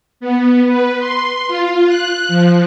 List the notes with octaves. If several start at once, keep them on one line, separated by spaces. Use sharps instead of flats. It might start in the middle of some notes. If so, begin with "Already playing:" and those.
B3
B4
C6
F4
F#6
F3